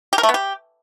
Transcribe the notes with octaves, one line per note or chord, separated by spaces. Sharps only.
G4
A#4
A3
B3
G4